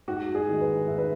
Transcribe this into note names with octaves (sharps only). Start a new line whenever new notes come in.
G#2 F#4
G#4
D#3 G#3
B4
G#2 E5
B4